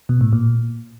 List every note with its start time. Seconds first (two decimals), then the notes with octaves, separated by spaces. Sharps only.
0.09 B2
0.21 A2
0.33 A#2